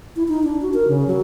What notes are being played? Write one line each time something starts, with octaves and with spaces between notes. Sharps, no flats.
E4
D#4
D4
F#4
A#4
C#3
F#3